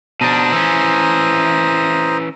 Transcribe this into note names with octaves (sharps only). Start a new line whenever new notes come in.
B2 D4 C5 A#5 D#6
E3 C#4